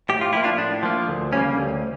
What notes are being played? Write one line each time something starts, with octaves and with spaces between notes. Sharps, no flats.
A2 G4
F4
F3 A#3 E4
D4 F4
A2 D4
F3 A#3
D2
C#3 G3 A#3 C#4
D2